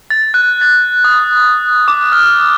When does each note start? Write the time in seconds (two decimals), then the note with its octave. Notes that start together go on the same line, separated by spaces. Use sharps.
0.10 A6
0.34 F#6
0.61 A6
1.04 D#6
1.88 D6
2.12 F6